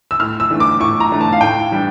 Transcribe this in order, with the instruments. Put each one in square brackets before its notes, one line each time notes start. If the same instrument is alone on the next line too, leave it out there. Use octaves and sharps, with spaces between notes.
[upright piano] E6
A2 F6
E6
E3 A3 D4
D6
A2 C#6
A#5
E3 A3 D4
A5
F5
A2 G5
E3 G3 D4